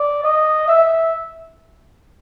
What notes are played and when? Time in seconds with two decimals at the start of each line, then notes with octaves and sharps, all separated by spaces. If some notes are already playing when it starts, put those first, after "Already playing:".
Already playing: D5
0.24 D#5
0.68 E5